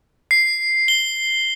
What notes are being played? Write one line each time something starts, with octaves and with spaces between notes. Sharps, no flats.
C7
G7